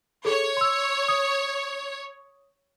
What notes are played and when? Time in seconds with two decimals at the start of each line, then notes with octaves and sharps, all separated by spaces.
0.25 G#4 A4 C#5
0.57 C6 E6
1.08 D#6